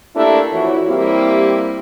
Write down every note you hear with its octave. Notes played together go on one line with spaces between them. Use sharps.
A3 A#3 D4 E4 G4 A#4
F2 E3 E4 F#4 C#5
G3 A#3 C4 E4 G4